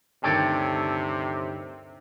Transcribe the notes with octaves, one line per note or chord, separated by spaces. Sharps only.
D2 G2 C3 D#3 A4 C#5 G5